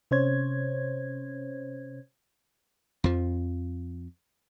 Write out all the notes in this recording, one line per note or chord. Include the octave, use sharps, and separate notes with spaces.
C3 C#4 C5 C#5 G#6
F2 F3